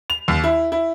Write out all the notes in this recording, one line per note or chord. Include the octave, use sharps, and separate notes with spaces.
F7
D#2
E4
E4